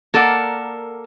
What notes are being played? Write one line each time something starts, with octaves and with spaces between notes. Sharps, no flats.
A#3 A4 A#4 D5 F#5